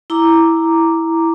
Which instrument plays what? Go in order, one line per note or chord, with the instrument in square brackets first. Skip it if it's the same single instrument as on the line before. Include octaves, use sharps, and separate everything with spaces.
[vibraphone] E4 A#5 D6